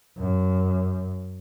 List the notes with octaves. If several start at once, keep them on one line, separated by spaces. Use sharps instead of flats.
F#2